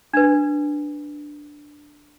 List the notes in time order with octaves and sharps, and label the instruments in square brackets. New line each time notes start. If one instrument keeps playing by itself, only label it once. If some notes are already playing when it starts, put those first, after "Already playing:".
[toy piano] D4 B4